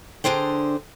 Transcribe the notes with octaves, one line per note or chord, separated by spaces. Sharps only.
D3 D4 G#4 C5 G5